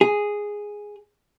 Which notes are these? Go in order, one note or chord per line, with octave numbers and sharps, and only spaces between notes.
G#4